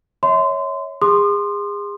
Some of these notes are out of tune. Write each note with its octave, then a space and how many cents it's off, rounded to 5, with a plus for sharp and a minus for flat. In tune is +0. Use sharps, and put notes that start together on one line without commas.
C#5 +0 E5 -35 C6 -25
G#4 -30 C6 +0 D#6 -40